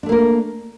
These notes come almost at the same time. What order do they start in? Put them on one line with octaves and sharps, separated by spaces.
D4 A3 A#3 A#4